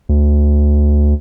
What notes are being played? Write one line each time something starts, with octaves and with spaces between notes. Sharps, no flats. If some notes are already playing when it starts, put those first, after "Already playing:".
D2